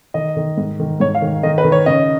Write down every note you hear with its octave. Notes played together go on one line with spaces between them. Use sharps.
D#3 D#5
D#3
G#2
D#3
G#2 C#5
F5
D#3
D#3 D#5
B4
D#3
C#5
C#3 D#5